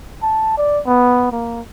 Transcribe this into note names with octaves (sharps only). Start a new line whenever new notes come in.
A5
D5
B3
A#3